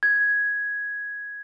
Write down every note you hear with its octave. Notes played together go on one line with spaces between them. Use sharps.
G#6